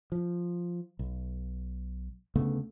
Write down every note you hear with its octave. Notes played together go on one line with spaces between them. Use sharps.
F3
B1
D2 C#3 A3 B3